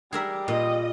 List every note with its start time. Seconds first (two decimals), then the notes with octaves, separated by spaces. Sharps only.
0.13 G3 G#4 A#4 E5
0.48 A#2 D#5